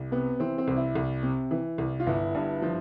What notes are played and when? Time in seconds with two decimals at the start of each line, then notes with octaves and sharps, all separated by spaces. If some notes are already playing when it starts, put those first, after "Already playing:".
Already playing: C2
0.11 C3 B3
0.40 E3 C4
0.58 C4
0.68 C2
0.76 E4
0.95 C2
1.23 C3
1.51 E3
1.78 C2
2.00 F4
2.07 G1 E4
2.34 G2
2.62 F3